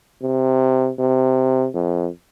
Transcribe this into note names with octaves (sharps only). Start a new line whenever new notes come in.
C3
C3
F2